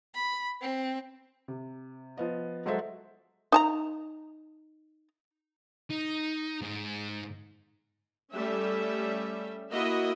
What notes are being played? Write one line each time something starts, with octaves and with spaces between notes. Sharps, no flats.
B5
C4
C3
F3 B3 D#5
F#3 G#3 F#4 A4 C5 E5
D#4 A5 A#5
D#4
G#2
G3 A3 C#4 G4 E5
A#3 E4 F#4 D#5 E5